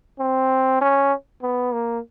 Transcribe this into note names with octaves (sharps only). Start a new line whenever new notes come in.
C4
C#4
B3
A#3